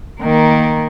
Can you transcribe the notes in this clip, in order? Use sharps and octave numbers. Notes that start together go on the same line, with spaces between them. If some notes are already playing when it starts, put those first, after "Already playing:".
D#3 A#3